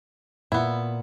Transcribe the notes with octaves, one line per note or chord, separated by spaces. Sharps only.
A#2 B3 E4